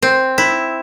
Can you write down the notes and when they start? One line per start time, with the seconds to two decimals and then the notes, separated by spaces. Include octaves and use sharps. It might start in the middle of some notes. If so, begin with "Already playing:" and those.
0.02 C4
0.38 E4